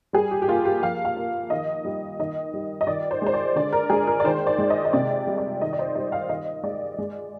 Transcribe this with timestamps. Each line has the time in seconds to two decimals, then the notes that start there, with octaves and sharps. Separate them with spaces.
0.13 G3 G#4
0.31 G4
0.42 G4
0.48 A#3 F4
0.65 G4
0.82 F3 F5
1.05 F5
1.17 A#3
1.50 D#3 D#5
1.85 G3
2.19 D#3 D#5
2.54 G3
2.81 D#5
2.87 D#3 D5
3.11 C5
3.22 G#3 C5
3.34 D5
3.56 D3 D5
3.72 A#4
3.90 G#3 G#4
4.07 A#4
4.20 D5
4.24 D#3 C5
4.47 D5
4.58 G#3
4.70 D#5
4.85 D#5
4.93 C3 D5
5.27 G3
5.38 D5
5.61 D#3 D#5
5.73 D5
5.79 C5
5.95 G3 D#5
6.12 F5
6.29 D#3 D#5
6.63 G#3 D5
6.98 G#3